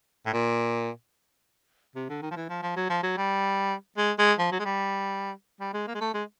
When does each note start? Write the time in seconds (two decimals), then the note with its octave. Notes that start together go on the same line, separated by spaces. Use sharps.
0.26 A2
0.33 A#2
1.96 C3
2.09 D3
2.22 D#3
2.31 F3
2.36 E3
2.49 F3
2.63 F3
2.76 F#3
2.90 F3
3.03 F#3
3.18 G3
3.98 G#3
4.19 G#3
4.39 F3
4.52 F#3
4.60 G#3
4.65 G3
5.60 G3
5.74 G#3
5.88 A#3
5.95 G#3
6.01 A3
6.14 G#3